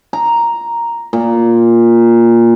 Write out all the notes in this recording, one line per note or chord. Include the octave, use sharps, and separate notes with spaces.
A#5
A#2